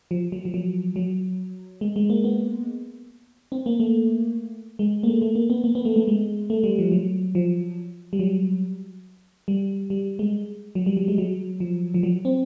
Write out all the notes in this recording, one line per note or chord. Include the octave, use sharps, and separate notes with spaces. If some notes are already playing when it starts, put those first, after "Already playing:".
F3
F#3
F3
F#3
F#3
G#3
G#3
A#3
B3
C4
A#3
A3
G#3
A#3
A3
A3
A#3
B3
A#3
B3
A3
A3
G#3
A3
G3
F3
F#3
F3
G3
F#3
G3
G3
G#3
F#3
G3
F#3
G#3
F#3
F3
F3
F#3
C4